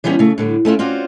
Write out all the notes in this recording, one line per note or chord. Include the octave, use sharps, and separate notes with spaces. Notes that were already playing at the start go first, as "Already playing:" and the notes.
E3 F3 G3 B3 C#4
C#3 A3
A2 D3 G3
A3 C#4 E4 F4
C4 C#4 F4 F#4 D5